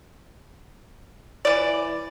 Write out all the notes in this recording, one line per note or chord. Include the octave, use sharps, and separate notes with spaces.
E3 D5